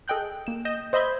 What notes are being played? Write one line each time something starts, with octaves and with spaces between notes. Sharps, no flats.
G#4 A4 D#5 G5 F#6 G6
A#3 E7
D#5 G6 E7
C5 D#5 E5 B5 G6 G#6